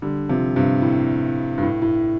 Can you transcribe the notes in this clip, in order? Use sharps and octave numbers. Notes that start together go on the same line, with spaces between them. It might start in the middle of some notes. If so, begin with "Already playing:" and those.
D3 G3
C3 F3
G2 C3
A2
G2
A2
A2